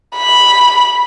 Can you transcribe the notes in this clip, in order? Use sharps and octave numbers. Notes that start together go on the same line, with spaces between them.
B5